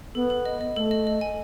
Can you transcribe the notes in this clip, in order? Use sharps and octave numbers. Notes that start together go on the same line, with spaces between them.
B3 A4
A4
D#5
D#5
A3 A4
D#5
D#5
G#5